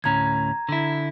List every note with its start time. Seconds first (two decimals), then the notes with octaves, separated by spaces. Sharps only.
0.04 D2 A2 C#4 A#5 G#6
0.69 D3 E4